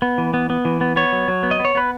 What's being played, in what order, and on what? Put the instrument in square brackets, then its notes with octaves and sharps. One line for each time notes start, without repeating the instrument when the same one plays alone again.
[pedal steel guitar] B3
E3
B3
B3
E3
B3
B3 C#5
F#3
F#3
B3
D#5
B3
C#5
B3 B4